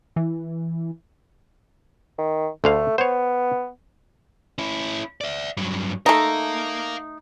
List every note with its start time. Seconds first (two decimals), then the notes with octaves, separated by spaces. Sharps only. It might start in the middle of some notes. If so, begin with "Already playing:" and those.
0.16 E3
2.18 D#3
2.64 D2 D3 A3 F5
2.98 B3 C5 C#5
4.59 C#4 E4
5.21 D5 E5
5.57 G2 F#3
6.06 A3 D#4 A#4 F5